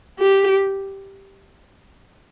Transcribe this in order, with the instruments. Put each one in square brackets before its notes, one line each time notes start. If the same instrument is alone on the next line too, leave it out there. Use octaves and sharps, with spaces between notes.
[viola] G4